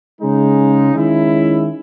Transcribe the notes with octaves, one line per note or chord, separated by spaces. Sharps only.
C#3 G#3 D#4
D#3 G#3 C#4 E4